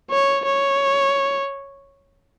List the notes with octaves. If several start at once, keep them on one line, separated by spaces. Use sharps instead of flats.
C#5
C#5